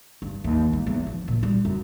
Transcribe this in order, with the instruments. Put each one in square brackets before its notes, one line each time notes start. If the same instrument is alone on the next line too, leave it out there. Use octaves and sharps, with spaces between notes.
[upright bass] G2
D#2
G#3
E2
F3
A#2
G3
F#2